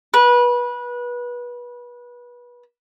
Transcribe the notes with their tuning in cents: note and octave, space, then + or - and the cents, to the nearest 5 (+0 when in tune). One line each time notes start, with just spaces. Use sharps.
B4 -25